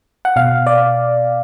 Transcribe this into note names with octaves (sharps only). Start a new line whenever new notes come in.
F#5
B2 F5
D5